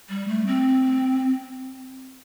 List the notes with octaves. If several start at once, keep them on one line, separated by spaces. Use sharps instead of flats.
G3
A3
C4